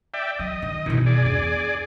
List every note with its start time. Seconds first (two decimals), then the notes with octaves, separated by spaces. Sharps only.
0.14 D5 E5 G5
0.39 F#3 D#5
0.62 D#3
0.86 F#2 B2 D#3 E3
1.06 G#4 D5
1.26 E2 D4